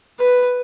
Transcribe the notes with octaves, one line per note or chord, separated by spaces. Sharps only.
B4